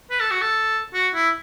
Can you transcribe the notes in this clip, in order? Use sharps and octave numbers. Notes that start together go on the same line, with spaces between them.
B4
A4
F#4
A4
F#4
E4